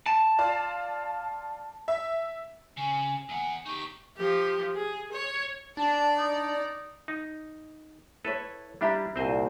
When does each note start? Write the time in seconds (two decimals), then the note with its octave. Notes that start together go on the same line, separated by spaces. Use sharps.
0.06 A5
0.38 F4 D5 F5
1.88 E5
2.77 C#3 G#5
3.29 E2 F#5 G#5
3.66 D#4 G4 C#6
4.16 F3 G4
4.75 G#4
5.12 C#5
5.77 D4 D5 A5
6.17 D#4
7.08 D#4
8.25 E4 A4 B4 C#5
8.81 G3 D4 E4 G4 E5 A#5
9.16 C2 A#2 C4 C5 D#5